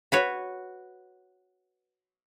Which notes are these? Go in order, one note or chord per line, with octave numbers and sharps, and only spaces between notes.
F#4 B4 C#5